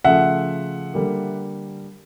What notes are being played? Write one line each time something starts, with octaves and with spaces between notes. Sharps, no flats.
C#3 F3 A3 E5 F#5
D3 G3 A#3